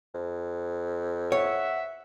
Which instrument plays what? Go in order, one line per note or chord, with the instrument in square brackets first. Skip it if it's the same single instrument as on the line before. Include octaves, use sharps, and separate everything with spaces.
[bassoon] F2
[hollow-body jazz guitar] C#5 [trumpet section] E5 F#5